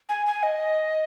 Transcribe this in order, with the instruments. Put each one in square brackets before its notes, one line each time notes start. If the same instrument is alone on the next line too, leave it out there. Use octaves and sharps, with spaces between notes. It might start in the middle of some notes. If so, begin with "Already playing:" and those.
[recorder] G#5
G#5
D#5